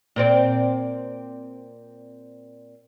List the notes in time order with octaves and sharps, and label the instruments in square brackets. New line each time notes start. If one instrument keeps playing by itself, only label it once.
[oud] A#2 C4 D5